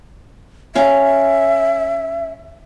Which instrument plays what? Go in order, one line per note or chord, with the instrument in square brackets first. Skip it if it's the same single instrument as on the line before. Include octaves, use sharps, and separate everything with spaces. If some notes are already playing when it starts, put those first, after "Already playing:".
[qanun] C#4 F5 [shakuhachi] E5